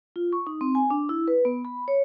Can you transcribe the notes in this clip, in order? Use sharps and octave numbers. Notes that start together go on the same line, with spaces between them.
F4
C#6
D#4
C4
G#5
D4
E4
B4
B3
B5
C#5